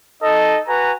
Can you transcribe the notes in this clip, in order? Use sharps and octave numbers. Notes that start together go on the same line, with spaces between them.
D#4 A4 D#5
F#4 B4 G#5 A#5